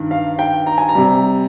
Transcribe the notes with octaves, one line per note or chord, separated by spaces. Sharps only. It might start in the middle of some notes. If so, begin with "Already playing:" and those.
Already playing: G2 D#3
F5
G5
A#5
G#5
A#5
C3 G3